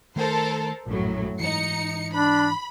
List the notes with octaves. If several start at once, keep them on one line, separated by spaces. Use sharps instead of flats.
D#3 A3 A4 A#4 C5
A#1 F#2 A2 F#3
G#2 E3 D#4 C#7
D4 B5